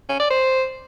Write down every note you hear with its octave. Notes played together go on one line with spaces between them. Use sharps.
C#4
D5
C5